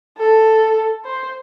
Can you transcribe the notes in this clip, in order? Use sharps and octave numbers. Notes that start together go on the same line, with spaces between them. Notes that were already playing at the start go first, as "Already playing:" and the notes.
A4
C5